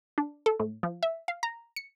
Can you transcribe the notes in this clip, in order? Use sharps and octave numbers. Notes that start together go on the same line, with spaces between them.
D4
A4
A2
F3
E5
F5
A#5
C#7